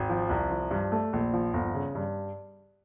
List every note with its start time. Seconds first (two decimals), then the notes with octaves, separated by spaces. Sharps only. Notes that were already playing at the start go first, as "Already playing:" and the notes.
Already playing: G#1
0.09 F3
0.30 C2
0.51 F3
0.71 G2
0.92 A3
1.13 A#1
1.33 F3
1.53 G1
1.75 C#3
1.95 G2